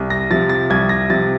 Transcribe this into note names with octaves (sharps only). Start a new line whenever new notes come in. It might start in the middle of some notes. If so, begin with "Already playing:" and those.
Already playing: C2
A#6
C3 F3 A6
A6
C2 G#6
A#6
C3 F3 A6